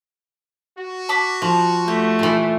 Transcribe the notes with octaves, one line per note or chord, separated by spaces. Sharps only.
F#4
A5 B5 D6
F3
A3 G4
A#2 E3